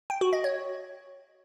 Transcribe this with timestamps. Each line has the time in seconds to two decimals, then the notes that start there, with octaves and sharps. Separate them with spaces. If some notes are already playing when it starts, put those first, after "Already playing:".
0.10 G5
0.21 F#4
0.33 D#5
0.44 C#5